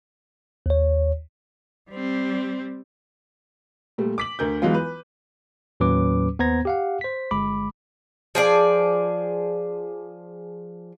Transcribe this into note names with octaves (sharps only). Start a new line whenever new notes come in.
D#2 C#5
G3 C4
A#2 G3 A3
D6 B6 F#7
D2 A#4 G6
E3 F#3 G#3 B3 F4
B4
D#2 A2 F#3 C#4 B4 D6
D#2 B3 C5 A#5 G#6 A#6
G4 F5 F#5
C5 B6
G1 G#3 B5 D6
F3 G#4 D5